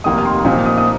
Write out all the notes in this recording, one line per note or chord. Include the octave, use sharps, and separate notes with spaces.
F1 D#2 D#3 A#3 D#6
D#6
C6
A#2 F3 C4 D#4
D#6
D#6